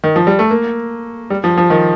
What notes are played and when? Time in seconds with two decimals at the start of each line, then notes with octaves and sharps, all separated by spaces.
0.04 D#3
0.16 F3
0.27 G3
0.39 A3
0.50 A#3
1.30 G3
1.44 F3
1.58 F3
1.70 D#3